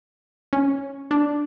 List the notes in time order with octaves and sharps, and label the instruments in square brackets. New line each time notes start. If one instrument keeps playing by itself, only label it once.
[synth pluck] C#4
D4